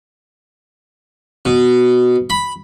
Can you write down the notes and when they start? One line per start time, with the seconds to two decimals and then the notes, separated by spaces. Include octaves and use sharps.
1.46 B2
2.30 B5